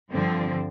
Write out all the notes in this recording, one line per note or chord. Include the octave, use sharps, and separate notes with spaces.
G2 D3 F3 C4